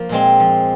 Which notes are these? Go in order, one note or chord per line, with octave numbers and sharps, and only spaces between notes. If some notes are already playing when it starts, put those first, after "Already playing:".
Already playing: F3 A#3
A#2 G#3 C4
F3